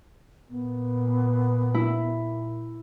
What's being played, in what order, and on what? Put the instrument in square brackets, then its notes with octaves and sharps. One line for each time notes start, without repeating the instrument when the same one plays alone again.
[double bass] A#2 [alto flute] B3
[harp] E4